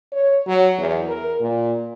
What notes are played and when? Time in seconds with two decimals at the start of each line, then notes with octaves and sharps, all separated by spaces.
0.12 C#5
0.47 F#3
0.78 E2
1.08 A#4
1.40 A#2